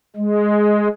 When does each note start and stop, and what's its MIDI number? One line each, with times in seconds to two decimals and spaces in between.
0.16 0.88 56